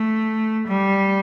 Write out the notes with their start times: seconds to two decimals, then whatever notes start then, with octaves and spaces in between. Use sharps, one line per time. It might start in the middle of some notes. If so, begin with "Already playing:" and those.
Already playing: A3
0.68 G3